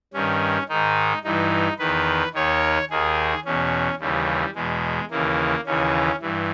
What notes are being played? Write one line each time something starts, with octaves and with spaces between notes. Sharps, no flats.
G2 D#3 C#4
G#2 D#3 D#4
G2 E3 D#4
E2 D#3 B4
D#2 D#3 C#5
D#2 D#3 G#4
E2 B2 C#4
D#2 C#3 E3 G3
E2 B2 G#3
D#2 C#3 E3 A#3
D#2 C#3 E3 C#4
G2 E3